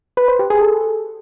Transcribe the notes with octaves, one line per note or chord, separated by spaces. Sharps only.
B4
C5
G4
G#4
A4